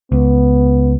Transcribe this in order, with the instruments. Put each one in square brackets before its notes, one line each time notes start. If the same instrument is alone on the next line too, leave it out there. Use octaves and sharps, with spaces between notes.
[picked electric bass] C#2 [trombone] B3